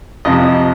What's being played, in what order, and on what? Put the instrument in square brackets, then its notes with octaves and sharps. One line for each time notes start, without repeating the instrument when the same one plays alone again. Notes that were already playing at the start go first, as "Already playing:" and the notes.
[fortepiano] F2 C3 F3 D#5